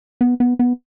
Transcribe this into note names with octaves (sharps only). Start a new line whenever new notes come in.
B3
B3
B3